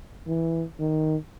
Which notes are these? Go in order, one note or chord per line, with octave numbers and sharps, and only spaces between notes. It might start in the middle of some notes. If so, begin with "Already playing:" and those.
E3
D#3